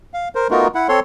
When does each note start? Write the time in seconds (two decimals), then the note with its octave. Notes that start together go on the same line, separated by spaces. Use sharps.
0.14 F5
0.35 A#4 C5
0.50 A3 B3 D#4 F4 F#4 A#4
0.75 E4 F#5
0.89 C4 A4 C#5 C6